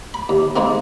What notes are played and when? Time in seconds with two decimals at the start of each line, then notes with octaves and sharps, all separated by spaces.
0.14 B5
0.29 D#2
0.56 D#3 G#3 A#3 C4